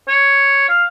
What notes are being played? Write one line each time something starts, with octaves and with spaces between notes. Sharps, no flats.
C#5
F5